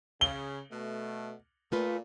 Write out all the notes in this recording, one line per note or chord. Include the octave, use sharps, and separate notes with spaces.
C#3 G7
B2 A3
A#2 A3 F4 B4